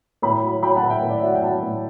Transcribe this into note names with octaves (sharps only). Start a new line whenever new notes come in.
A2 G5 B5
F#3
F#3 G5 B5
F#5 A5
A2
E5 G5
A2
D5
E5
F#3 F#5
G5
F#3 F#5 A5
A2